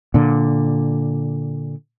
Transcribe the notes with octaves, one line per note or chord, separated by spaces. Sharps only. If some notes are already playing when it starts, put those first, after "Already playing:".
A#2 D3